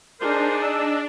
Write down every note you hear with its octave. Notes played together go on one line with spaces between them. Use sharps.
D4 D#4 G#4 A#4 C5
D#5 E6